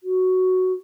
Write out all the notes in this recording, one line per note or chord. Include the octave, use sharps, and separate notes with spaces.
F#4